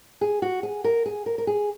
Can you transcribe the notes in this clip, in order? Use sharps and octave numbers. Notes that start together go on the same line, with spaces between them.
G#4
F#4
G#4
A#4
G#4
A#4
A#4
G#4